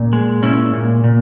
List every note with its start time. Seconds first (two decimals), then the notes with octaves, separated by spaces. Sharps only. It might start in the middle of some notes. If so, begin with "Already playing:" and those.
Already playing: A#2 C#4
0.13 G#3
0.43 A#2 C#4 E4
0.74 A#2
1.04 A#2